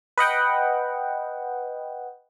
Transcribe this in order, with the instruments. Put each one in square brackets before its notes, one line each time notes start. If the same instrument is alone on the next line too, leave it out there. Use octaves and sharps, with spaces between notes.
[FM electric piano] B4 D#5 F#5 G5